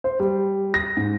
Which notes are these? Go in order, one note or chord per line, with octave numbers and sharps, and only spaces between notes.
C5
G3
A#6
G#2